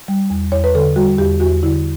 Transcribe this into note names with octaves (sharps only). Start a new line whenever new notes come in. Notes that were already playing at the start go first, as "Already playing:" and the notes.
G3
E2
E2 C#5
B4
D3 A4
G3 F#4
E2 G4
E2 F#4
D3 E4